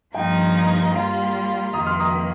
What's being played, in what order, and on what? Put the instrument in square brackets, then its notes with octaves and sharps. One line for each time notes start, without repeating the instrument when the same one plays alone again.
[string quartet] G2 F3 A#3 D#4 [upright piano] G5
[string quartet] G3 A#3 F4 [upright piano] F5 A#5
[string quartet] F2 D#3 A#3 [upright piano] A#5 D#6
[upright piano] C6 F6
A#5 D#6